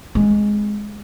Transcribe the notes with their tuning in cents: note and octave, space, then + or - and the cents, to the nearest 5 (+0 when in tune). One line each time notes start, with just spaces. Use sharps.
G#3 +0 C4 +0